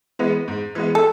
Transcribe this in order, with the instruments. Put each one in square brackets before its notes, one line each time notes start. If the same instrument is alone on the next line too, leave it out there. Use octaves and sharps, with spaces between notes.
[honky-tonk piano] E3 G#3 B3
G#2
E3 G#3 B3
[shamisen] A4